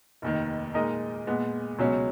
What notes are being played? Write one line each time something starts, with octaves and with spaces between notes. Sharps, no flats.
F1 D#2 D#3
A#2 G#3 D#4 A#4 D#5
A#2 G#3 B3
C#2 B2 F#3 C#4